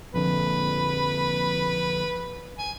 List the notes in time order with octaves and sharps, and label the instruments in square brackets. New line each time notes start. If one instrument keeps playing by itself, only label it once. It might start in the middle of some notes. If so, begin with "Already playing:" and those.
[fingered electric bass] A#1 F2 D3 [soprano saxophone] B4
[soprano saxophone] G#5